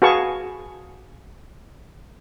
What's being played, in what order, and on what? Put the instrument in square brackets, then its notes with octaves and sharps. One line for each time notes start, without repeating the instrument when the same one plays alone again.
[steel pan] F#4 G#4 B4 F5 A5 C#6